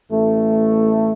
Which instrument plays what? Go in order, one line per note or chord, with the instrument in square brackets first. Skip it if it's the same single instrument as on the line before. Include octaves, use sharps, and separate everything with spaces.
[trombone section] A1 A3